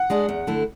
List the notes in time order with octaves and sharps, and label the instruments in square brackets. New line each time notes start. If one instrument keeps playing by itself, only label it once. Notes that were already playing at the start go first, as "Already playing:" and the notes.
Already playing: [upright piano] F#5
[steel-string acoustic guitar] G#3 D4 G#4
E2
D3 A3 E4